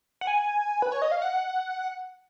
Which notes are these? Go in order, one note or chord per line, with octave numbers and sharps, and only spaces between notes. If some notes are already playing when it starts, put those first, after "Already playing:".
F#5
G#5
B4
C#5
D#5
F5
F#5